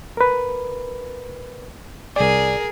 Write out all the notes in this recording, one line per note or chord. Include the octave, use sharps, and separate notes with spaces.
A#4 B4
C2 G#4 A#4 D5